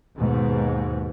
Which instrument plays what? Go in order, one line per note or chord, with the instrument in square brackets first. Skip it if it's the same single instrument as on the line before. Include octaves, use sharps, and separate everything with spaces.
[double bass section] D#2 G#2 B2